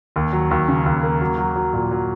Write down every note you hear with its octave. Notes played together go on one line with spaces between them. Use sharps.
D#2
F#3
D#2
C#3
D#2
A#3
F#3
F#3
F#3
A#2
F#3